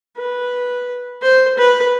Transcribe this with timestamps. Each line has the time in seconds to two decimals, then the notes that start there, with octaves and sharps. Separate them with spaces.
0.17 B4
1.22 C5
1.58 B4